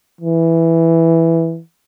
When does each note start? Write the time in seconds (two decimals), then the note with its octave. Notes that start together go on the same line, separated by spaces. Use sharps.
0.21 E3